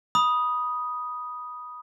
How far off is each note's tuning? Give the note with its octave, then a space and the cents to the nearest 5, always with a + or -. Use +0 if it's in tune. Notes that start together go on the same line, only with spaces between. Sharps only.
B5 -15 D#6 +0